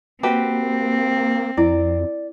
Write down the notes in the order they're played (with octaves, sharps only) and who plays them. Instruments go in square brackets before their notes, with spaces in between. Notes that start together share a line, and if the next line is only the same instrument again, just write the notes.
[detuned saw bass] A#3 [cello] C4 [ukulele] F#4 G4 B4
[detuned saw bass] F2 [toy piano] E4 [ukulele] D5